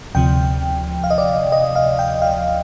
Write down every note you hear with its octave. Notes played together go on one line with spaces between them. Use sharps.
D2 C3 F3 G5
F5
D#5
D5
D#5
F5
G5
F5